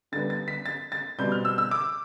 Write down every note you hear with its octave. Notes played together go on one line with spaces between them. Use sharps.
D2 D3 G3 B3 A6
A6
B6
A6
A6
B2 G3 C4 G6
F6
E6
E6
D6